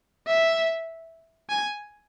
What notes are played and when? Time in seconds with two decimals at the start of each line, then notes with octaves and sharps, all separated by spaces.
0.28 E5
1.49 G#5